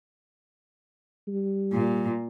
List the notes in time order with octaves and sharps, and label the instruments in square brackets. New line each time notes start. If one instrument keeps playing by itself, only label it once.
[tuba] G3
[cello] A#2